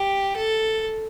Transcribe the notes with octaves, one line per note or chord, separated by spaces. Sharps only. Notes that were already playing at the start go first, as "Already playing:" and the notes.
Already playing: G4
A4